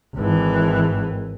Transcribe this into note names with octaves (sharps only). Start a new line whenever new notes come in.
G#1 E3